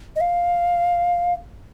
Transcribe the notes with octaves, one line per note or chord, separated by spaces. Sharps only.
D#5
F5